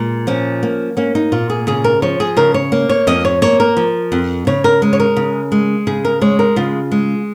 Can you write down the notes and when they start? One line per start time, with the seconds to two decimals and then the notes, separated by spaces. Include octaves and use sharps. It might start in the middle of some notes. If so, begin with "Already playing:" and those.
Already playing: A#2 G#3
0.27 F3 C#4
0.63 A#3
0.97 A#3 C#4
1.15 D#4
1.32 A#2 F4
1.50 G#4
1.67 C#3 G#4
1.84 A#4
2.02 F3 C#5
2.20 G#4
2.37 C#3 A#4
2.54 C#5
2.72 A#3
2.89 C#5
3.07 F2 D#5
3.25 C#5
3.42 A#3 C#5
3.60 A#4
3.77 F3
4.12 F2
4.47 C#3 C#5
4.64 A#4
4.82 G#3
4.93 C#5
5.00 A#4
5.16 C#3
5.52 G#3
5.87 C#3 G#4
6.05 A#4
6.21 G#3 C#5
6.39 A#4
6.56 C#3 F4
6.92 G#3